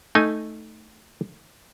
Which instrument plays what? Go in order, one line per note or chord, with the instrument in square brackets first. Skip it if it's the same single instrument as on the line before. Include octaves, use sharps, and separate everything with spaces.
[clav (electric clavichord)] A3 D#4 G#5